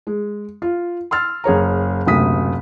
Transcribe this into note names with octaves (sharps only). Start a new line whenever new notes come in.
G#3
F4
C6 E6 F6 A6
F#1 G#4 C#5 A#5
F#1 D2 C3 D#6 B6